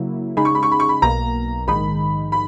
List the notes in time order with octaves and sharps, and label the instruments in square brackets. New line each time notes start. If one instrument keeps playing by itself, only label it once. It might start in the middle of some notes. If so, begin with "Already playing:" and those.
Already playing: [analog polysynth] C#3 F#3 A#3 E4
[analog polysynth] C#3 G#3 D#4 G#4 [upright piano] B5
[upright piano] C#6
B5
C#6
B5
C#6
B5
[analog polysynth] B1 B2 A#3 [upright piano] A#5
[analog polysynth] A#1 G#2 D#3 G#3 D#4 [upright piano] B5
[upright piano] B5